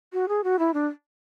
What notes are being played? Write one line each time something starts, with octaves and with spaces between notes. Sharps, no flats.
F#4
G#4
F#4
E4
D4